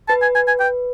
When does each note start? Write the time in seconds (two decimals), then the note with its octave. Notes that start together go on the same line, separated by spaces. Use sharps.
0.09 B4 A5
0.22 G#5
0.35 G#5
0.48 G#5
0.60 G5